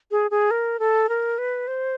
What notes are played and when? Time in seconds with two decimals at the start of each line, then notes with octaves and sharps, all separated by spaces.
0.11 G#4
0.31 G#4
0.51 A#4
0.79 A4
1.09 A#4
1.38 B4
1.68 C5